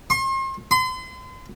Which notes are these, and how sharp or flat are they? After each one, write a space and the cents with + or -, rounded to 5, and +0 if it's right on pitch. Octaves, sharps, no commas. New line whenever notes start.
C6 +40
C6 -40